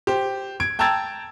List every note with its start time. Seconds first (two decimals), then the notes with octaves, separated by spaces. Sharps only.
0.07 G4 C5
0.60 G#6 D7
0.79 G5 A5 A#5 E6 G#6 A6